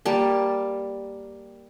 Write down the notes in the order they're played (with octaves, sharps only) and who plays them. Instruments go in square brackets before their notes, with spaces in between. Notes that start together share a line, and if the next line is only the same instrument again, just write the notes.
[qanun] G3 A#3 A5